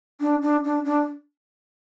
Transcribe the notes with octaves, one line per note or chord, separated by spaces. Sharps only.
D4
D4
D4
D4